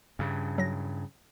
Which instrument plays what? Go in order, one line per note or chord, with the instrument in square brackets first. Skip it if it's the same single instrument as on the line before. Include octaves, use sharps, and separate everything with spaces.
[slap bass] G2 C#3
[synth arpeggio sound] F#3 A#6